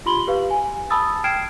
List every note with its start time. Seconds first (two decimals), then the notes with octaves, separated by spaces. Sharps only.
0.06 F4 G4 B5 C6 F#7 G7
0.27 G4 B4 F5
0.51 G#5
0.90 A5 B5 D#6 E6 A6
1.24 G5 F6 G#6 C7 D7 E7